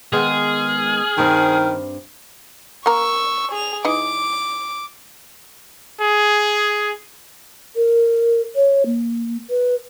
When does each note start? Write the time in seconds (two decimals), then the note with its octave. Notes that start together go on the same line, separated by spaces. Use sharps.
0.13 D#3 G#3 B3 G#4 F6
1.18 G2 D#3 C4
2.86 A#3 A#4 C#6 E6
3.52 G#4 F7
3.85 E3 D#4 D#5 D6
6.00 G#4
7.76 A#4
8.55 C#5
8.86 A#3
9.50 B4